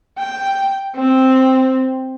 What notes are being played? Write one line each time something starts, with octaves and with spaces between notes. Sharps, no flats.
G5
C4